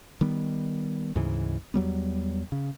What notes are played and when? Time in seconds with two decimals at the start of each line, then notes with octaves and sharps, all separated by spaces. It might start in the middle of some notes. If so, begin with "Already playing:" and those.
0.21 D#3 G3 B3
1.15 D2 G#2 C#3 E3
1.74 E2 F#3 G3 B3
2.52 C#3